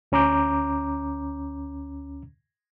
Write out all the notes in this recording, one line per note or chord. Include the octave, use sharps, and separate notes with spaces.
D2 C#4 A#5 D6 G6